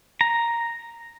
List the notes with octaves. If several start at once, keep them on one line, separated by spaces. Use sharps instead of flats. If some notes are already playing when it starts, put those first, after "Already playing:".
A#5